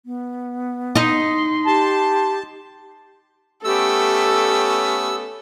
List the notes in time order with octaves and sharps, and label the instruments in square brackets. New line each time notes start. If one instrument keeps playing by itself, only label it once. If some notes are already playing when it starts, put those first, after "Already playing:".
[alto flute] B3
[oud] D#4 D#5 [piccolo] C6
[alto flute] G4 [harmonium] A5
[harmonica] A3 B3 C#4 [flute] G4 [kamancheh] A4 [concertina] E6